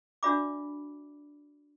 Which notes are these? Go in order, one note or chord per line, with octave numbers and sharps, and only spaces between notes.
D4 F#4 D5 E5 B5 D6